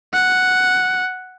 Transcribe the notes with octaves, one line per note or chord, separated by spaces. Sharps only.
F#5